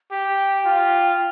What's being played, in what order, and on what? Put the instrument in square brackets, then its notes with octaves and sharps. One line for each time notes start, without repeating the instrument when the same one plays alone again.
[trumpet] G4 [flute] G5
[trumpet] F4